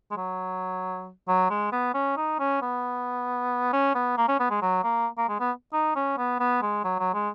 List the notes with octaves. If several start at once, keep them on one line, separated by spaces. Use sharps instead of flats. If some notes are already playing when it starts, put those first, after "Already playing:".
G#3
F#3
F#3
G#3
B3
C#4
D#4
C#4
B3
C#4
B3
A#3
C#4
B3
G#3
F#3
A#3
A#3
G#3
B3
D#4
C#4
B3
B3
G#3
F#3
F#3
G#3